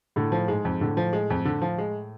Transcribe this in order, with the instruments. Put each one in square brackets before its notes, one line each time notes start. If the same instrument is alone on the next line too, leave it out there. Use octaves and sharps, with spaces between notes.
[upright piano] A2 [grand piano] D3
[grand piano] F3
[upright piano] G#2 [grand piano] G#3
[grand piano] F2
[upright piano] A2 [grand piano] D3
[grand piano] F3
G#3
F2
D3
F3
G#3